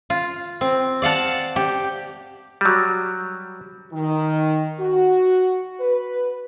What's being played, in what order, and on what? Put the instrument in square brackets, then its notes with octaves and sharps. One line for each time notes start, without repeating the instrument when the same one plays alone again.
[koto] F4
C4
D5 F5 F#5 A5
G4
[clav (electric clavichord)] F#3 G3
[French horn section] D#3
F#4
B4